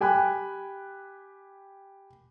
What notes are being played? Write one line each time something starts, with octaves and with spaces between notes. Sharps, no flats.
G4 G5 G#5 B5 F#6